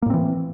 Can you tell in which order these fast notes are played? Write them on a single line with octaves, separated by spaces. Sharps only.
A#3 A2 C4 E3